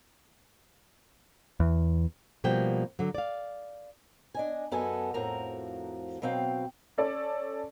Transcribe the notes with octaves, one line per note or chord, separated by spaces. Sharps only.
E2
B2 F3 G3 A#3 G5
D3 F#3
D5 F5
D4 D#5 G#5
F#2 B3 A4 D#5 G#5
F2 A2 F3 F#4 A#4 A#5
B2 F#3 C4 F5 G5
C#4 A4 D5